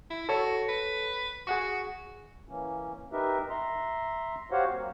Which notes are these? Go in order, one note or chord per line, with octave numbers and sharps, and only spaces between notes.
E4
F#4 A4 C#5
B4
F#4 G#4 F#5 C#6
E3 A#3 C#4
D#4 G4 A#4 B4 E5
E5 A#5 C6
F#4 G4 C5 C#5 F5 F#5
F#3 A#3 C4